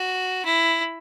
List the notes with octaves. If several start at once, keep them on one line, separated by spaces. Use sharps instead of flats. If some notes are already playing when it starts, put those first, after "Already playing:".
Already playing: F#4
E4